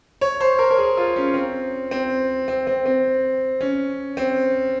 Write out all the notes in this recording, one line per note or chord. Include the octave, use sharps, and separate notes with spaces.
C#5
C5
A#4
A#4
G#4
F4
C#4
C4
C4
C4
C4
C4
C#4
C4